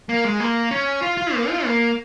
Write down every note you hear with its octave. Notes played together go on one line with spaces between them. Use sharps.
A#3
G#3
A#3
C#4
F4
F4
A#3
F4
A#3